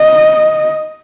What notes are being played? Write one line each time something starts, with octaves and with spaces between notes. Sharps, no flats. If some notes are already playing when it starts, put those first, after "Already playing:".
Already playing: D#5